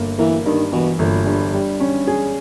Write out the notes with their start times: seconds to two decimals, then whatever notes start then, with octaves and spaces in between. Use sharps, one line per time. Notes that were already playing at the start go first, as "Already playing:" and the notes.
Already playing: G1 A#3
0.19 E3 A#3
0.46 G2 D#3
0.72 B2 E3
0.99 G1 A#2
1.26 G2
1.53 G2 G3
1.80 C#4
2.08 G#4